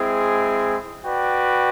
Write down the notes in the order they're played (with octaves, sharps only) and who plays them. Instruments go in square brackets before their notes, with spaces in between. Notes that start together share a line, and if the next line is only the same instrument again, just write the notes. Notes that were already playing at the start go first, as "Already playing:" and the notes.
Already playing: [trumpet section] G#3 C4 E4 G#4
F#4 B4 D5 G5